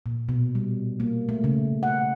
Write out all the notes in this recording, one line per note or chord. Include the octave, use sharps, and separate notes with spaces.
A#2
B2
G3
A#3
A3
C#3
F#5